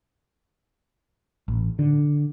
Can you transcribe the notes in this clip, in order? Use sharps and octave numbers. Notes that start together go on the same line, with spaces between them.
A1
D3